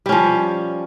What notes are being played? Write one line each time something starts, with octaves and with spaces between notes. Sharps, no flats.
F3 G3 C#4